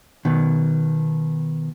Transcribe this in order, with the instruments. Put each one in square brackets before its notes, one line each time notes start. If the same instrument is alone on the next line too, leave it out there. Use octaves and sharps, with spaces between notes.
[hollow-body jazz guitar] B2 D#3